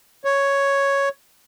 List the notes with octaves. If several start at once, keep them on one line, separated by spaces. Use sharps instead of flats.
C#5